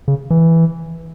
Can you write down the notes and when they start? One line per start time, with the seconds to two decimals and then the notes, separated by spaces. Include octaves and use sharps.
0.08 C#3
0.30 E3